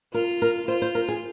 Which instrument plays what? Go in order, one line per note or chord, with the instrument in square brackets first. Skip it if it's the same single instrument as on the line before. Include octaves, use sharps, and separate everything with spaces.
[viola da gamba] F4 [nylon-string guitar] A#4
[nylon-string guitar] A#4
[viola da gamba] F4 [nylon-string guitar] C5
[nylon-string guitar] C5
A#4
G#4